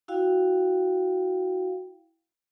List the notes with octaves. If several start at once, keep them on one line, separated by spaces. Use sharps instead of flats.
E4 F#4 F5 G5